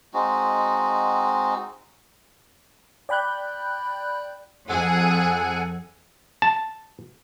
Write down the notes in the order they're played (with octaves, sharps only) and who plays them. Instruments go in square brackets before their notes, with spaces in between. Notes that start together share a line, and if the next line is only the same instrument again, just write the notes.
[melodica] G#3 C4 D#4 F#4
[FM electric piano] D5 G5 B5 F#6 G6
[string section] F2 G#4 [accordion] A4 F#5 G#5
[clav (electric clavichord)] A5